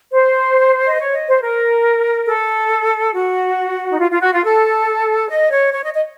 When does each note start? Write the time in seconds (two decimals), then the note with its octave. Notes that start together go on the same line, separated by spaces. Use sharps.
0.12 C5
0.88 D#5
0.99 C#5
1.13 D#5
1.27 C5
1.42 A#4
2.27 A4
3.15 F#4
3.92 D#4
3.99 F4
4.10 F4
4.21 F#4
4.33 F4
4.44 A4
5.30 D#5
5.50 C#5
5.72 C#5
5.83 D#5
5.93 D#5